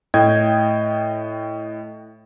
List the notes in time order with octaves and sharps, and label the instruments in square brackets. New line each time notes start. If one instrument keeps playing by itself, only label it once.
[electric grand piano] A2 D#5 G5 G#6